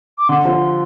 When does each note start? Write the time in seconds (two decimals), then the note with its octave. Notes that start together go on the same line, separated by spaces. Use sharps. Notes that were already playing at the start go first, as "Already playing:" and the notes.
0.18 D6
0.29 D3 C6
0.45 F3